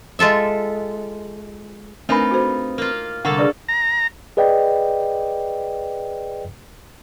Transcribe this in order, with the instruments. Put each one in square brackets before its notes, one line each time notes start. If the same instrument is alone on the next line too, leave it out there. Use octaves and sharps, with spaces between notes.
[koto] G#3 F4 A4 E5
[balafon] A3 A#4 G#5 [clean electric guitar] C4 B4 [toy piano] D4 [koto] D#4 F4
[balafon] F#4 A4 C5
[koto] A#3 F4
[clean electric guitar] C2 D3 [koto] A#3 A4 [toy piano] F#5 C#6
[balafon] D4 G#4 [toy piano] B4 D5 C#6
[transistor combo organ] A#5
[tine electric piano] G#4 B4 D5 D#5 G5